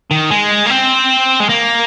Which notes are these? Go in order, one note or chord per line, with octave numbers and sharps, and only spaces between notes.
D#3
G#3
A#3
C4
G#3
A#3